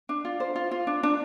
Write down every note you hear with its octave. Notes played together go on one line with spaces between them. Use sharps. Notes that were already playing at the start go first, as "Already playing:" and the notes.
D4
F4
C5
F4
F4
D4
D4